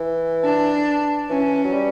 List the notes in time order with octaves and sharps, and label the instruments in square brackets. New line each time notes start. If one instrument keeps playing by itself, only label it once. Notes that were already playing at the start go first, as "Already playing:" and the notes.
Already playing: [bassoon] E3
[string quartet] D4
[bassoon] E3 [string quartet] C#4
[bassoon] F#3
G3